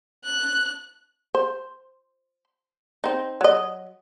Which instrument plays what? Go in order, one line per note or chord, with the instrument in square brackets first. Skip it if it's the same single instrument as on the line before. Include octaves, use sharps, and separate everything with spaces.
[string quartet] F#6
[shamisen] C5
C4 D#4
F#3 D#5